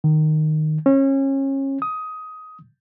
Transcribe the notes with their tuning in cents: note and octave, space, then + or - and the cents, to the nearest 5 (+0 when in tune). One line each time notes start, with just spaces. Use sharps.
D#3 -10
C#4 -30
D#6 +15